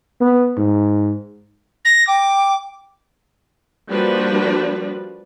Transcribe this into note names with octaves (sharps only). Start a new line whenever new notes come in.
B3
G#2
A#6
G5 D6
F3 G3 A#3 D4 F#4 B4